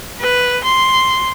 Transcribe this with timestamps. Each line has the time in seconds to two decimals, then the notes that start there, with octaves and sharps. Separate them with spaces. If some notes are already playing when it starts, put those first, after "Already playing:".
0.20 B4
0.64 C6